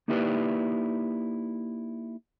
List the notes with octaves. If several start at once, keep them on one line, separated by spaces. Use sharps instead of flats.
A#3 D#4 E4 G4 B4 D5